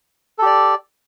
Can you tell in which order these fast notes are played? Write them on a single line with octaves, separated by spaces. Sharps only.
A4 G4 D5